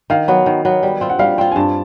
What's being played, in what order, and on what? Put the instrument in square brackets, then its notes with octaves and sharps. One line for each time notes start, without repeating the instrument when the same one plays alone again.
[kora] D#3 [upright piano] F5
[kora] F#3 B3
D#3
F#3 B3
G3
C4 F4
[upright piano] F#5
[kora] G3 [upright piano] F5
[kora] C4 F4 [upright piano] G5
[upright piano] G#5
[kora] G2 [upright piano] A5